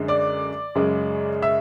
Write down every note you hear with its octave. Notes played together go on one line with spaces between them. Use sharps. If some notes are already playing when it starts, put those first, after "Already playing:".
Already playing: F#2 D3 G#3
D5 D6
F#2 C#3 G#3
E5 E6